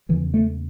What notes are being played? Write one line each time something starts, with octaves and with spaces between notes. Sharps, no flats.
E2 C#3 E3
A3